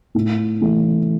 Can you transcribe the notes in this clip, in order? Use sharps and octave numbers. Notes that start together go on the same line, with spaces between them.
A2
E3 A3